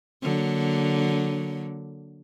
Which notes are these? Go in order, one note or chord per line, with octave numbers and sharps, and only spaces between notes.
D3 F#3 A#3